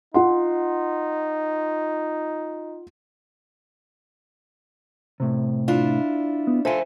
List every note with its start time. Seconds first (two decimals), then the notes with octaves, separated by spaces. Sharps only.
0.14 D#4 F4 F#5 C6
5.20 A2 C3
5.68 D4 E4 F4
6.47 B3
6.65 F4 A4 C5 E5 G#5